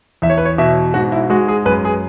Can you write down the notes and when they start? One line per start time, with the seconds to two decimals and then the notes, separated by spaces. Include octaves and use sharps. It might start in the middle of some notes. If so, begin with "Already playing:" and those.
0.22 E2 E5
0.30 C#5
0.38 B4
0.45 C#5
0.58 B2 E5
0.94 G#2 F#4
1.12 E4
1.30 G#3 F#4
1.48 G#4
1.66 F#2 B4
1.85 G#4